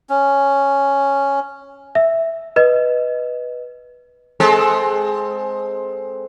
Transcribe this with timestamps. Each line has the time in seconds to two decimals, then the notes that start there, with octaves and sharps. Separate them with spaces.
0.10 C#4
1.95 E5
2.56 B4 D#5
4.40 G#3 C4 A4